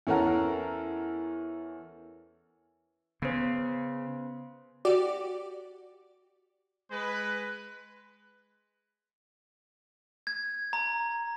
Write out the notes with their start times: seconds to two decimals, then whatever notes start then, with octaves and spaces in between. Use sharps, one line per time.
0.07 E2 C#4 A4 A#4 F#5 A#5
3.22 C#3 B3 C5
4.85 F#4 G4 D5 D6
6.92 G#3 B4
10.27 G#6
10.73 A#5